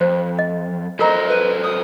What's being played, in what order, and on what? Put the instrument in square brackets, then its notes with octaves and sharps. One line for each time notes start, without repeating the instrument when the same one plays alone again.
[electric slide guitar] F2 [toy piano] C5
[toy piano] D#5
[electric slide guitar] F#3 A4 C5 [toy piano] F4 A#4 A#5 [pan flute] D#5
[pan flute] B4
D#6